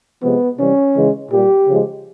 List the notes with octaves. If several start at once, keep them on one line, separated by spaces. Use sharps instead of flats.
C3 F3 G#3 B3
C3 E3 G3 C#4
C#3 E3 G#3
A#2 G3 G4
C#3 F3 G#3